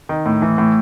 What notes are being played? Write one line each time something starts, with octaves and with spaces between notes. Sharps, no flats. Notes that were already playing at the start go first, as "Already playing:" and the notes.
D#3
A2
E3
A2